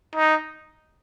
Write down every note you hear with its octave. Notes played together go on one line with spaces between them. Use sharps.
D#4